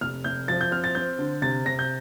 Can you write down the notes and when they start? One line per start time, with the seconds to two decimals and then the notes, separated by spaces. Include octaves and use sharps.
0.01 F1 F6
0.24 F1 G6
0.48 F3 A6
0.61 G6
0.71 C4 F6
0.84 A6
0.95 C4 G6
1.19 D3
1.42 C3 A6
1.65 C3 A#6
1.79 G6